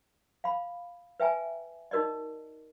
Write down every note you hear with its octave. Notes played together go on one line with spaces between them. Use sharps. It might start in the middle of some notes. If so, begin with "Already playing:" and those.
F5 B5
B4 E5 G5 G#5 A#5
D#4 F#4 A#4 D5 D#5